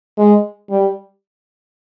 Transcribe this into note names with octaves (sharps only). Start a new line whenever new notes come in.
G#3
G3